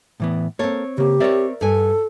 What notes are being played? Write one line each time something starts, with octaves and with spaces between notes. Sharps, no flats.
A2 E3 B3
A#3 C4 A4 C#5
C#3 A#3 G4
C4 A#4 C#5 D5 E5
G2 A4 G#5